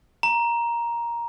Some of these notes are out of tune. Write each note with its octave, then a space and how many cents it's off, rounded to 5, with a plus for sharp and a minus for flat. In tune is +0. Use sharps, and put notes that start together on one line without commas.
A#5 +10